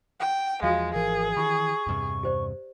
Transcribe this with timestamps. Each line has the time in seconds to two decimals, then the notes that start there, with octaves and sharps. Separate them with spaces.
0.20 F#5 G5
0.63 E2 F3 G#3 F4 F#4 F5
0.94 G#1 E3 F3 G#4 A#4
1.37 D#3 E3 G4 B5 C#6
1.87 E2 G2 C3
2.23 G4 C5 D5